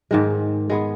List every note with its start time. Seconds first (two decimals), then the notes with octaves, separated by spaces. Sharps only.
0.11 G#2 D#3 G#3
0.70 G#3 B3 G#4